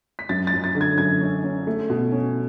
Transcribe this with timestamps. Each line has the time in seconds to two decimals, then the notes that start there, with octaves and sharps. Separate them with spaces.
0.19 B6
0.29 F#2 A6
0.47 A6
0.53 F#2
0.64 A6
0.75 D3
0.81 G#6
0.98 F#2 G#6
1.21 C#4
1.44 C#4
1.67 A3
1.90 B2
2.12 C#4